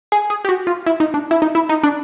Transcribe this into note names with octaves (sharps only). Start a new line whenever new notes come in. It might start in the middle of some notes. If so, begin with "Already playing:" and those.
G#4
G#4
G4
F#4
F4
E4
D#4
D4
E4
D#4
E4
D#4
D4